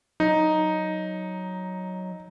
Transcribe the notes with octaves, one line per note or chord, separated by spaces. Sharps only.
F#3 D#4